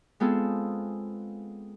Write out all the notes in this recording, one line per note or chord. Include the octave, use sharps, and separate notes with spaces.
G#3 B3 C4 F4 G#4 A4